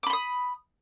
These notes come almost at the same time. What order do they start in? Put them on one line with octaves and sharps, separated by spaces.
D6 B5 C6 D#6